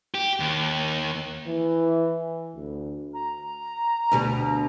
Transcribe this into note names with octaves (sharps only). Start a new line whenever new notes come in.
G4
D#2
E3
D2
A#5
D2 B2 G3